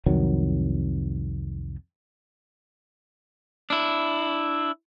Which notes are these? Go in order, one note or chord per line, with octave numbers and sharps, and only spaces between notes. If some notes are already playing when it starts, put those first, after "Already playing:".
C2 F2 D#3 F#3
D4 E4